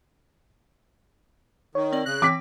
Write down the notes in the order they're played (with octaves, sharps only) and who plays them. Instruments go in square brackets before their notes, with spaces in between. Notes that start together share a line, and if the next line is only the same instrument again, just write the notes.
[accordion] D#3 [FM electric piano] C#5
[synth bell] C4 D5 F#7
[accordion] C#3 F#6 [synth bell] A#6
[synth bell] E3 C4 G5 [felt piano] D6 B6